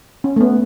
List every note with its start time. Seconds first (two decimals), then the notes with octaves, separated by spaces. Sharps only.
0.24 C#4
0.36 A3
0.40 B3